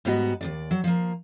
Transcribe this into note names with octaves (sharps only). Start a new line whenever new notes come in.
G#2 G3 B3 F#4 D#5
D#2 A#2 D5
F#3
F3 A#3